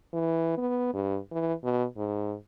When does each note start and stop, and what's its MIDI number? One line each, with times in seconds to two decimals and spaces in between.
0.13 0.57 52
0.57 0.90 59
0.94 1.18 43
1.32 1.53 52
1.64 1.84 47
1.97 2.35 44